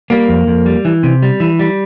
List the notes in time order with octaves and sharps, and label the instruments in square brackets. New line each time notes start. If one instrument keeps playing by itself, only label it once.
[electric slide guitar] G3 A#3
F2
F2
G3
E3
C3
G3
E3
G3